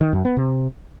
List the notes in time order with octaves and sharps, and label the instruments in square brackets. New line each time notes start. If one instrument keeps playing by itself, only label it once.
[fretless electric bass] D#3
F#2
B3
C3